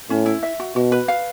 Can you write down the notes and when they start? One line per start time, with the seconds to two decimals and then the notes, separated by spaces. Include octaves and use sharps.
0.10 A2 C#4
0.26 E4
0.43 E5
0.60 F#4
0.76 B2 F#4
0.92 B4
1.08 F5